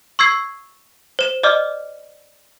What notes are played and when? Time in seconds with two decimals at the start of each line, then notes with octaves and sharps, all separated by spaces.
0.19 C#6 E6 G#6 C7
1.19 C5 E7
1.43 D5 D#5 D6 F6